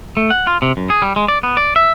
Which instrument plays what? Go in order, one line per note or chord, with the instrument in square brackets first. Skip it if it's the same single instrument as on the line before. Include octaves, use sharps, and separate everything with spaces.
[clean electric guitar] A3
F#5
F4
C3
F#2
G#4
G3
G#3
D5
B3
D5
E5